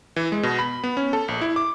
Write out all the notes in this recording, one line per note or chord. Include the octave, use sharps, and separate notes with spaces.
E3
G#3
B2
B5
B3
C#4
A4
A#1
E4
D6